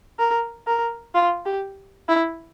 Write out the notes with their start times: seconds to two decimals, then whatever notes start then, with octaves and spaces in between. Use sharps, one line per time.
0.19 A#4
0.67 A#4
1.15 F4
1.46 G4
2.09 E4